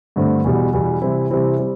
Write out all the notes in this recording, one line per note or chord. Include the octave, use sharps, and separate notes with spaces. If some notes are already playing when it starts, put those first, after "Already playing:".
G2 D3 A3 C4
E2 B2 G3
E2 B2 G3
C3 E3 G3 C4 E4
C3 E3 G3 C4 E4
G3 C4